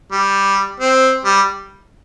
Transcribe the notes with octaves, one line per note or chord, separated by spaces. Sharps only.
G3
C4
G3